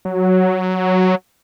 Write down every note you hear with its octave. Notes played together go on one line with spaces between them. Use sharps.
F#3